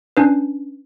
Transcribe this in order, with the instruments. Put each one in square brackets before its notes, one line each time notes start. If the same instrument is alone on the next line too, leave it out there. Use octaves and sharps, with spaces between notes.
[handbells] C#4 D4 B4